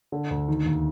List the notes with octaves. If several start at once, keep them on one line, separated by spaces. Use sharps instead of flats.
D3
D2
D#3
D#2